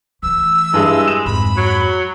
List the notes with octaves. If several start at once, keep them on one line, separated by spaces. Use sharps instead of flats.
E3 A3 E6
G2 G#3 E4 G#4
E7
F2 G#2 B5
F#3